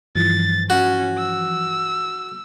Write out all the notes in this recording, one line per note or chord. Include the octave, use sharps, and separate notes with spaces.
G2 E3 F3 A6
C#4 F#4
E6